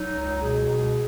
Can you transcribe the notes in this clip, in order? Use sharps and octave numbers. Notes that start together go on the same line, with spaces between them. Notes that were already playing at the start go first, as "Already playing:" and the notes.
Already playing: F#3 D#4
C#2
B2 G#4
C#2